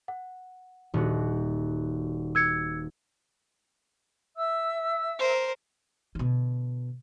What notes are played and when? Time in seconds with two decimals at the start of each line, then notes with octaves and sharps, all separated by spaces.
0.08 F#5
0.94 D#1 F#4
2.35 E6 G#6 C#7
4.37 E5 E6
5.19 A#4 C5
6.15 B2 D3